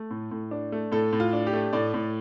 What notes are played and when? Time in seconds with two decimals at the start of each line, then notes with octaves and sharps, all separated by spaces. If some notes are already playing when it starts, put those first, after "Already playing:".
Already playing: A3
0.11 A2
0.31 A2
0.51 D4
0.72 A3
0.92 A2 A4
1.13 A2
1.20 F4
1.33 D4
1.47 G4
1.53 A3
1.73 A2 D5
1.94 A2